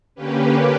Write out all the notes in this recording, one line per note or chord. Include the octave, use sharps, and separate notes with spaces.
D3 A#3 C#4 G4 B4